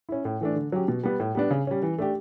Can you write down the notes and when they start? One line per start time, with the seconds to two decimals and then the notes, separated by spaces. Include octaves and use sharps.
0.09 C#4 E4
0.25 A2
0.41 E3 A3 D4
0.56 D3
0.72 F#3 C#4 G4
0.88 B2
1.03 G3 B3
1.20 A2
1.35 G3 B3 D4
1.50 C#3
1.67 G3 C#4
1.83 E3
1.99 A3 D4 G4